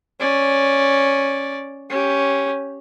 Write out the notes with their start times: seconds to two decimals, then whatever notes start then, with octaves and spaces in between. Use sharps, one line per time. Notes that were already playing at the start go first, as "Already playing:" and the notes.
0.20 C#4 D5
1.90 C#4 G4